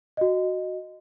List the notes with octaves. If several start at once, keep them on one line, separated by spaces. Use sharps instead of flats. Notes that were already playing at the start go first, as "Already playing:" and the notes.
F#4 D#5